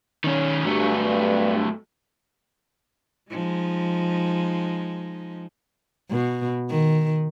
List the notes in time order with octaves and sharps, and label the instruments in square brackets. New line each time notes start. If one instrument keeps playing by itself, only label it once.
[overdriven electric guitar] D#3 C#4
[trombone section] G2 [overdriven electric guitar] F#3 A3
[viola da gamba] F3 G#3 D#4
B2
D#3